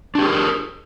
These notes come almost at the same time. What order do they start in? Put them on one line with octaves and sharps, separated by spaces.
D4 G4 G#4 A#4